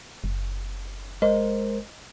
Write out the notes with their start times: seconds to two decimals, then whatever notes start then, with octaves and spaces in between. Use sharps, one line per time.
0.24 F#1
1.22 G#3 A#4 C5 D#5